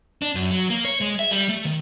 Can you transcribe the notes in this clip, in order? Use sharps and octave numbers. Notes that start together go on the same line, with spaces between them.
D4
F#2
F#3
A#3
C#5
G#3
E5
G3
A3
D#3